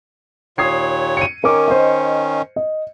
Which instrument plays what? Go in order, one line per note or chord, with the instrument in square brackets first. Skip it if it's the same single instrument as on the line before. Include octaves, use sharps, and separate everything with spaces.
[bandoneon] D#2 A#2 C#5 [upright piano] D#6 G#6 C7
[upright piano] C#7 D#7
[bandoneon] D#3 C#4 [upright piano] A#4 D6
[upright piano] C5 D#5
D#5